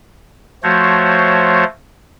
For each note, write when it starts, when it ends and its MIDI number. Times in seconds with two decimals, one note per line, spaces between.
0.63 1.64 53
0.63 1.64 57
0.63 1.64 66
0.63 1.64 72
0.63 1.64 73